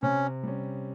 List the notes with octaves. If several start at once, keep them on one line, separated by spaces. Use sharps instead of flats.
C3 C#4
G3 C#4